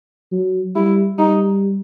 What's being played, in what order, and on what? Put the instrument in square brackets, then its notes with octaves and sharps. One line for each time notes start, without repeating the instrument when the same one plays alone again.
[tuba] F#3
[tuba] G3 [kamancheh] E4
[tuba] G3 [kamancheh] D#4